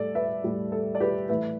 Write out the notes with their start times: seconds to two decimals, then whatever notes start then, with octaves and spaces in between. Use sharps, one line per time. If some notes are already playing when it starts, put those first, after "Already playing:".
Already playing: A2 G3 A4 D5
0.15 B4 E5
0.44 A2 G3
0.72 A4
0.95 D5
1.00 G4 B4
1.29 A2 E3 A3 B4 E5